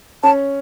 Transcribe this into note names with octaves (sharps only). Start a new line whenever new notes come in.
C#4 A5